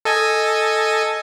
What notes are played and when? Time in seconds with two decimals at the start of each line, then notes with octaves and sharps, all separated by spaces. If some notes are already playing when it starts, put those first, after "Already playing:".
0.05 A4 D#5 G#5